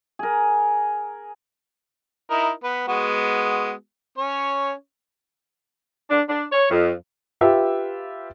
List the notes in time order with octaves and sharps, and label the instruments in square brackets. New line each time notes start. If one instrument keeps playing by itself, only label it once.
[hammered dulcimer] G#4 A#4
[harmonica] D#4 E4 A#4
B3 B4
G#3 B3 F#4
C#4 C#5
[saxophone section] D4
D4
C#5
F2
[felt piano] F4 G4 B4 E5 E6